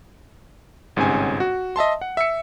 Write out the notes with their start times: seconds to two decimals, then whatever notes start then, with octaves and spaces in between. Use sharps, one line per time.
0.96 G1 G#2 C3 C#4 G#5
1.40 F#4
1.76 D#5 E5 A5 C6
2.01 F#5
2.17 E5 E6 C#7